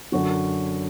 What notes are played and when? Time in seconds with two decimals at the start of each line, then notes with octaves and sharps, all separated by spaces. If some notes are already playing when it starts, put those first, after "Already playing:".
0.12 F#2 D3 F#4